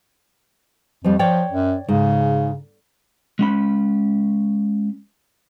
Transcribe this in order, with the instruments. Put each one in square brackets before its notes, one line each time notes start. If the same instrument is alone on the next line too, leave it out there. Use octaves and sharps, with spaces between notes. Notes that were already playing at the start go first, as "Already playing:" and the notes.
[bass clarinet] F2 [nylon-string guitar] F3 G3
[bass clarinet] F3 [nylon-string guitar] C#5 D5 G5
[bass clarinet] F#2
[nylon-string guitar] G#2 [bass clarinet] C#3
[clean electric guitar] G#3 C#4 B5